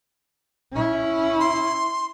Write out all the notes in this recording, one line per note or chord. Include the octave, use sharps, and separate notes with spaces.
C#4 E4
C6